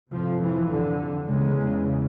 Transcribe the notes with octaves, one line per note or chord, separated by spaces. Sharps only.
F2 C3 F3
E3
D3
E2 C#3 G#3